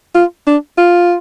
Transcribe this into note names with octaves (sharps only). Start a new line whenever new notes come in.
F4
D4
F4